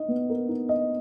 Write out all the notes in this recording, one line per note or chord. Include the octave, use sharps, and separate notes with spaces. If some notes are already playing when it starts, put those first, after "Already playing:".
Already playing: D#4 D#5
B3
A#4
D#4
D#5